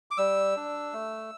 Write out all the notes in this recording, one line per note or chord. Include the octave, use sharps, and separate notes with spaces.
D6
G3 E6
D4
A3